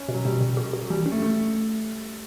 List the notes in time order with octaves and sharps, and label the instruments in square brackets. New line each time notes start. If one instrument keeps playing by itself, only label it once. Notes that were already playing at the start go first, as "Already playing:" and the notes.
Already playing: [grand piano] C#4
[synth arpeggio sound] B2
[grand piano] F#3
[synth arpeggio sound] B2 [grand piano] G3
[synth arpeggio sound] B2
F#4
F#4
[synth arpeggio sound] E3 [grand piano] G3
[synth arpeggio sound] C#4
[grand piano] A3
[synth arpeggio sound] A3